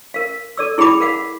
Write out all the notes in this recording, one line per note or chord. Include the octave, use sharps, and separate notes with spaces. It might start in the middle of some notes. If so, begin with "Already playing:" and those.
A#4 F5
A4 D5 E6
E4 G#4 G5 B5 D6
A#4 F5 F#5